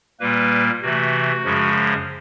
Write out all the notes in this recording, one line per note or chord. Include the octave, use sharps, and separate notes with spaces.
A#2 G3 A#3 B4
C3 E3 A3 F#4
F#2 C#3 F3 G#3